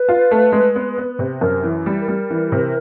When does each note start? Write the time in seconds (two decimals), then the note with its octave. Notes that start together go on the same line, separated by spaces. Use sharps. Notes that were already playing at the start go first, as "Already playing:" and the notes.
Already playing: B4
0.09 F4
0.31 A3
0.52 G#3
0.76 B3
0.98 B3
1.19 C3
1.41 F#2 A#4
1.63 E3
1.86 G3
2.01 A#4
2.08 G3
2.30 E3
2.52 C3